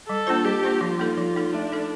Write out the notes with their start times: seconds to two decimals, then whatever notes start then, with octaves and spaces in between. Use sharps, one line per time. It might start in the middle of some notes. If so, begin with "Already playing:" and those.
0.09 G3 A4
0.27 A#3 D4 F4 C5
0.45 G3 G4
0.63 A#3 D4 F4 C5
0.81 F3 F4
0.99 A#3 D#4 A4
1.17 F3 F4
1.36 A#3 D#4 A4
1.54 A3 D4
1.72 D#4 A4